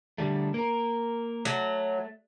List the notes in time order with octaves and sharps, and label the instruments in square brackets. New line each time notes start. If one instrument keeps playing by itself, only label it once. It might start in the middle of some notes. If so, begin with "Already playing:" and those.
[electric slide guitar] D3 G3 A3
A#3 A#4
[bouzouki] F#3 [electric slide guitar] A3